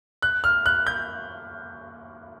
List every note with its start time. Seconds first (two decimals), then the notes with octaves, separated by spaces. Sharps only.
0.22 F#6
0.44 F6
0.66 F#6
0.87 G6